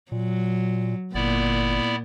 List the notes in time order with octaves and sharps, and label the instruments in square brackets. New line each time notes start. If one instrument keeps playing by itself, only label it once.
[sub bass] A#2 [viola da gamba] F#3
[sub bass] G1 [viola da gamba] A#2 [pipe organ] B3 E4 D5